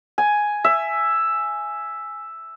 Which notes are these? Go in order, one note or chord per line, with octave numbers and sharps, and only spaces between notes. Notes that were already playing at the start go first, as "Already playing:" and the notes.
G#5
E5